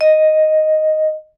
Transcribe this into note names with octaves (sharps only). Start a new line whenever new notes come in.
D#5